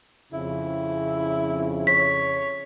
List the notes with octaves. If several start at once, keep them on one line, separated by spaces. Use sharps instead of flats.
F2 C#3 E4
C#5 B6